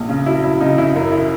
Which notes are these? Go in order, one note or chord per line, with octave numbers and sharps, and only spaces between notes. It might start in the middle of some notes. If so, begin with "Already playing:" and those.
Already playing: A#1
C#3
F#3 E4
F#3 E4
C#3 D#4
C#3 E4
F#2
E4